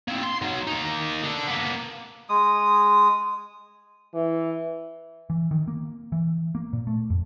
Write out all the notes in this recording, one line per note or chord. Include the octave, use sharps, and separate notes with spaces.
A#3 C4
C6
F#3 D#4
A#3 D#4
D3
A#3 B3
G#3 D#6
E3
E3
D#3
A#3
E3
A#3
A#2
A3
F2